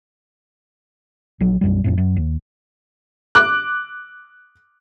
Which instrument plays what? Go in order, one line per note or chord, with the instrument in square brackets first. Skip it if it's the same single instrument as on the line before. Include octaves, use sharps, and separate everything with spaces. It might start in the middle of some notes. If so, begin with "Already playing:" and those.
[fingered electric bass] A#1 F#3
B1 F#2 G3
G1 F2 A2
F#2
D#2
[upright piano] D6 F#6